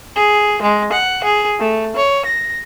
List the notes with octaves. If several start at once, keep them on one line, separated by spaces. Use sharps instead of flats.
G#4
G#3
F#5
G#4
A3
C#5
A#6